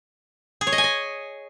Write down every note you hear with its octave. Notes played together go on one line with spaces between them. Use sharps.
G#4
C#5
D#5
G#5
D#5